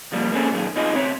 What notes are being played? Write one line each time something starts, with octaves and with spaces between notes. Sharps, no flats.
C2 F3 G3 A#3
A#3 C4 C#4 G#4 A4
A#2 D#3 F#3 G#4
B2 C4 D#4 F4 G#4 D#5
C#2 C4 C#5 E5